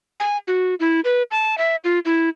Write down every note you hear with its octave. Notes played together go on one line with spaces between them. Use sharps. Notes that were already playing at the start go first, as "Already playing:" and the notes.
G#5
F#4
E4
B4
A5
E5
F4
E4